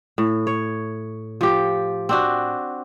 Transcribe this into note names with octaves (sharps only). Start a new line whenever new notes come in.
A2
C#5
F3 G4
C4 D4 F#4